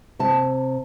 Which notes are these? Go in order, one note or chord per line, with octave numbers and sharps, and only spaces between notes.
C3 A5